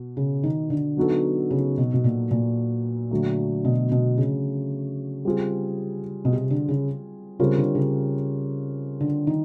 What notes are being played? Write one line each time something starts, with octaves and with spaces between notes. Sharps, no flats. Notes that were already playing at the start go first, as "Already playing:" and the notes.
Already playing: B2
C#3
D#3
D3
F#3 B3 D#4 F#4 A4
C#3
B2
B2
A#2
A#2
D3 F#3 A3
B2
B2
C#3
G3 C4 F4 G#4
B2
C3
D3
C#3
C#3 G3 C4 F4 A#4 C#5
D3
C#3
D3
D#3